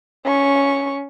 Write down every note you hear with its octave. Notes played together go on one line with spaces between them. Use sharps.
C#4 C#6